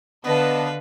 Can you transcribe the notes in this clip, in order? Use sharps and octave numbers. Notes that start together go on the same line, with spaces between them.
D3 B3 D4 B4 D#5 F5 A5